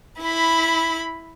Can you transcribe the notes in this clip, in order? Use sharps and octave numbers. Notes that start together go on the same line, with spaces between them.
E4 B5